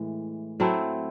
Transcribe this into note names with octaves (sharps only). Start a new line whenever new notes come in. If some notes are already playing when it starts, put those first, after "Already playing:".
Already playing: A2 E3 G#3
F#3 A3 C4 E4